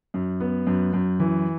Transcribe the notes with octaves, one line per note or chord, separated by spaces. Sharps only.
F#2
B3
F#2
F#2
E3